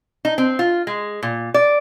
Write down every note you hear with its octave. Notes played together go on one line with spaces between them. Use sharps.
D#4
C4
F4
G#3
A#2
D5